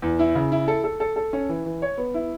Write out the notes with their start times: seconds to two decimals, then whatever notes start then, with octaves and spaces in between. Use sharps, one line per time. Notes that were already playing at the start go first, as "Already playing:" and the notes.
0.02 E2
0.19 E4
0.35 C#3
0.52 E4
0.68 A4
0.84 A4
1.00 A4
1.16 A4
1.33 C#4
1.49 E3
1.65 E3
1.82 C#5
1.98 B3
2.14 E4